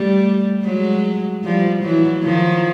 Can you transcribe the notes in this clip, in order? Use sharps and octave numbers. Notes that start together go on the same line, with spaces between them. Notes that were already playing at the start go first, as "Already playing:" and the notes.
Already playing: G3 A3
F#3 G#3
F3 G3
E3 F#3
D#3 F3